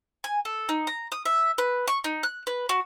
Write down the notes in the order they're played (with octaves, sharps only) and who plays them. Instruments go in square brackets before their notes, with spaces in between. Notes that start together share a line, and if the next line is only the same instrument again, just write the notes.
[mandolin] G#5
A4
D#4
A#5
D#6
E5
B4
C#6
D#4
F#6
B4
F#4